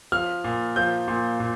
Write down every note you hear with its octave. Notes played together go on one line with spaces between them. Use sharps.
F3 F6
A#2
F3 G6
A#2
A#2